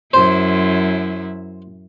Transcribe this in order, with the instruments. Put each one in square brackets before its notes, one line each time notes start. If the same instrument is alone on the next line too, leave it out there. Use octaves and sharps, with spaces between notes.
[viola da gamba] F#2 E4 [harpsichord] C5